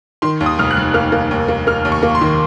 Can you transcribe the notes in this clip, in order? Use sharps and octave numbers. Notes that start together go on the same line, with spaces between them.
D#3 C6
D#2
D#6
F1 F6
F#6
F1
A#3 F6
A#3
D#2
A#3
A#3 F6
D#2
C#6
A#3
C6
D#3